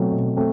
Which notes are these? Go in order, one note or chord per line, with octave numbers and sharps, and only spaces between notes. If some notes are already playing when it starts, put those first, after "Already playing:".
Already playing: B2 F#3 A3 C4
B2
A3 C4